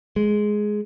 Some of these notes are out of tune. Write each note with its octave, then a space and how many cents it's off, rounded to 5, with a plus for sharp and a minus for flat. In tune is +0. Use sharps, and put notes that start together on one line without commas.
G#3 +10